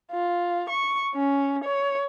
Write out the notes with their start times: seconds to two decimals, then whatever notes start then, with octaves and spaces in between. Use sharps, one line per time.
0.12 F4
0.70 C#6
1.14 C#4
1.64 C#5